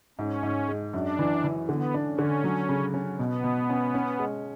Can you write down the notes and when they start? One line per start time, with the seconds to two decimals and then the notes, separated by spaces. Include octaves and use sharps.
0.19 G#2 C#4
0.43 G#2
0.69 G#3
0.93 F#2 D4
1.19 E3
1.44 E3
1.68 D3 B3
1.94 D4
2.06 C#4
2.19 D3
2.44 F#3
2.69 C#3
2.94 C#4
3.19 B2 B3
3.44 B2
3.69 C#4
3.94 C#4
4.19 G#3